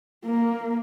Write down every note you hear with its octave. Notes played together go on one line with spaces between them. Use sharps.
A#3